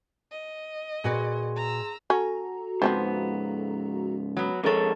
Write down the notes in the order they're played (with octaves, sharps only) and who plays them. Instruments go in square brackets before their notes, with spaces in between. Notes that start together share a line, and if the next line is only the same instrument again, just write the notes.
[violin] D#5
[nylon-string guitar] A#2 F#4 B4 [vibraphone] G#4 C6
[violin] A#5 E6
[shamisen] C#4 [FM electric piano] F#4 A4 A#5
[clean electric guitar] C#2 G#2 [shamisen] F3 C4 C5 [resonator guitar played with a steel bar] B3
[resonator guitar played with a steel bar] F#3 B3
[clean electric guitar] F2 G#3 C#5 [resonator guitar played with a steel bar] A4 A#4